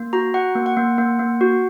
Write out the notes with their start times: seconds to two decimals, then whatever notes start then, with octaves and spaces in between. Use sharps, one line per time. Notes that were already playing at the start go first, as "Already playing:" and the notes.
Already playing: A#3
0.13 F#4 A#5
0.34 F#4 F#5
0.55 A#3
0.66 F#5
0.77 A#3
0.98 A#3
1.19 A#3
1.41 F#4